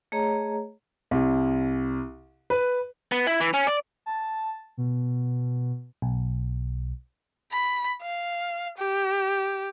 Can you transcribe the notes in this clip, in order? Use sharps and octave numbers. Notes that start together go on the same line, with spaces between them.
A3 G#4 C#5 D#5 A#5
C2
B4
B3
E4
E3
C#4
D5
A5
B2
B1
B5
F5
G4